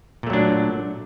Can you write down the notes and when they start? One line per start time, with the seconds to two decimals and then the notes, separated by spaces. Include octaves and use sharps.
0.23 A#2
0.27 A3
0.30 F#3
0.33 D4